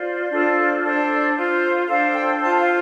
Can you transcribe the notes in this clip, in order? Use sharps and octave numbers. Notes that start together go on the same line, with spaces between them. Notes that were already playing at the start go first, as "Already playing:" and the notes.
Already playing: F4 C5 D5
D4 F4 A4 C5
D4 A4 C5
F4 C5
D4 A4 C5 F5
G5
F4 C5 A5
F5